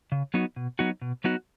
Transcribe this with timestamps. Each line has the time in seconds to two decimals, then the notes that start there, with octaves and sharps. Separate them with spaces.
0.12 C#3
0.34 F#3 B3 D#4 F#4
0.56 B2
0.79 F#3 B3 D#4 F#4
1.02 B2
1.24 F#3 B3 D#4 F#4